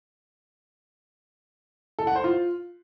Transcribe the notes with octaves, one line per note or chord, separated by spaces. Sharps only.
A4
F#5
C5
F4